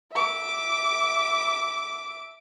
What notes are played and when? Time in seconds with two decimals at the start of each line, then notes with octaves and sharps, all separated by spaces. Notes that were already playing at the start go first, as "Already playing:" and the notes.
0.12 E5 D6